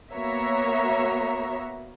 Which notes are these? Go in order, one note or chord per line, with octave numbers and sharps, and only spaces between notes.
A#3 B3 F#4 C#5 E5 A#5